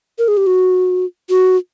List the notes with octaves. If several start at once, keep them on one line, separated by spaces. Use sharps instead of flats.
A#4
G#4
G4
F#4
F#4